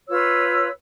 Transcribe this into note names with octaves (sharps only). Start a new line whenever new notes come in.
F4 B4 C#5 E6